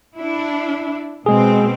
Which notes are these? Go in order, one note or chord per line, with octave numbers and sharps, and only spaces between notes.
D4 E4
B2 G#3 C4 G#4